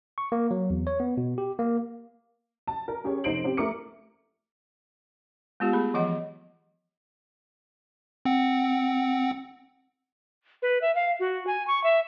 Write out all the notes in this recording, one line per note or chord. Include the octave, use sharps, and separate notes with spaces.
C#6
A#3
F#3
E2
C#5
B3
B2
G4
A#3
A5
A#4
C#4 G4 G#4 C#5
F1 D#4 C5 C7 D7 F#7
C4 G4 C5
A3 A#4 D6 C#7
G#3 B3 F4 G4
A3 G#4 B5
E3 F3 D#5 F#5
C4 F#5
B4
E5
F5
F#4
G#5
C#6
E5